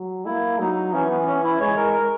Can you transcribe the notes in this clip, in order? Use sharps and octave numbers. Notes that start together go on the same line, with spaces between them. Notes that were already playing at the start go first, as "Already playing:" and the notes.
Already playing: F#3
A#3 E4
F#3 D#4
E3 C#4
B3
C#4
E4
G#3 C#5
A#4
A#4